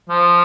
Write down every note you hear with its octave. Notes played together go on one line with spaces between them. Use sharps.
F3